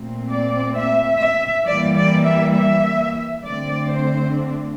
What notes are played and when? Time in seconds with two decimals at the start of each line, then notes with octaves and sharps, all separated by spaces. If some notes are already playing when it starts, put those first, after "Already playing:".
Already playing: A#2 A3 C4
0.31 D5
0.76 E5
1.20 E5
1.64 E3 G3 A#3 D5
1.95 D5
2.24 E5
2.53 E5
3.42 D3 A3 C4 D5
3.87 C5
4.32 D4